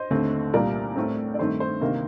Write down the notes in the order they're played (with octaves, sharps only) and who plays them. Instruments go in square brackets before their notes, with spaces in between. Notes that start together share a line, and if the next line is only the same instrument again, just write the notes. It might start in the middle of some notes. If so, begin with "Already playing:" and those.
Already playing: [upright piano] C5 D#5
D#2 D3 A3 C4
C2 A#2 G3 A#3 A#4 D5
A2 A3 C4
D5
G2 D#3 A3 C4 C5
C5
D2 C3 D#3 A#3